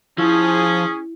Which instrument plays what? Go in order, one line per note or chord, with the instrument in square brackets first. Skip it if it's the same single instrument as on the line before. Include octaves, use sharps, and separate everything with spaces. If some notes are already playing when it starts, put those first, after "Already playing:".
[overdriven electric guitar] F3 [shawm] C#4 [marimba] E4 [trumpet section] G#4